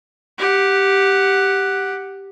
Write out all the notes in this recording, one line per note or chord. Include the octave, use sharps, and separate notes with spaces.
G4 F#5